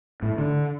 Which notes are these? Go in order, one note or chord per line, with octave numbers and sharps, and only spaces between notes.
A2
D3